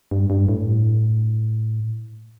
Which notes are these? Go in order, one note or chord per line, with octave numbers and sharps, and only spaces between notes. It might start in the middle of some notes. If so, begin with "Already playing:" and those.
G2
G2
A2